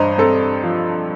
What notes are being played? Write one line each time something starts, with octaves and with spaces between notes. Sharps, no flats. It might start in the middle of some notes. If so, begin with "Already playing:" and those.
Already playing: G2 C5 D#5 A#5
C4 A4
F3